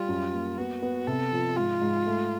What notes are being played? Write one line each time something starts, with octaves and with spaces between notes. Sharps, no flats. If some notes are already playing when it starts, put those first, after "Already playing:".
Already playing: G3 F4
F#2
A#3
B3 F#4
B3
C3 A4
F3
G#2 F4
G#2
A3